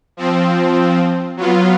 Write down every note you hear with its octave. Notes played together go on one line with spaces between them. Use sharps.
F3 C4
F#3 B3 F4